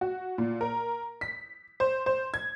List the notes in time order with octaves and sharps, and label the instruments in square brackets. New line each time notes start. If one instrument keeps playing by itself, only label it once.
[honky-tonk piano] F#4
A#2
A#4
B6
C5
C5
G#6